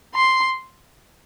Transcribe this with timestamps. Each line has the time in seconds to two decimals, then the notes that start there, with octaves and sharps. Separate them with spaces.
0.14 C6